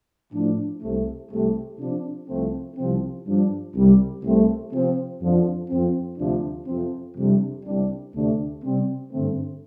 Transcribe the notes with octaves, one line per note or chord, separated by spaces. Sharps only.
A2 F3 D4
C2 C3 A3
C2 C3 A3
C3 F3 D4
C2 C3 F3 A3 C4
C2 C3 F3 C4
G2 F3 D4
C2 C3 G3
C2 C3 A3 C4
C3 F3 C4
F2 D3 F3 D4
F2 F3 C4
D2 C3 F3 D4
F2 C3 F3 C4
F2 C3 G3 D4
C2 C3 G3 D4
D2 C3 A3 D4
C3 G3 C4
G2 D3 A3 C4